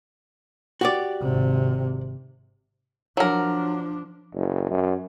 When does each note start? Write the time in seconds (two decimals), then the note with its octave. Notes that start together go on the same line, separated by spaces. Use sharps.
0.81 F#4 G4 D5
1.21 G#1 C3
3.17 F3 F#3 D4 A#4
4.34 F#1
4.70 F#2